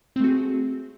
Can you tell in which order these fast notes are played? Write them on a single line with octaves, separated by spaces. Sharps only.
C4 A3 F#4 G#4